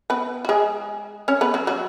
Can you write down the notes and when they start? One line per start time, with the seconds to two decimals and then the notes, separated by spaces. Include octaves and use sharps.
0.10 B3 B4
0.45 F#4
0.49 G#3 G#4
1.28 C#4 C#5
1.41 B3 B4
1.54 F#3 F#4
1.67 F#3 F#4